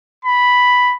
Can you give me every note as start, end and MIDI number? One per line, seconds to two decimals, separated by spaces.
0.25 0.95 83